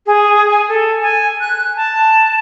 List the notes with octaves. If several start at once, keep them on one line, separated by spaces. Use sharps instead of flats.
G#4
G#5
A4
G#5
F#6
A5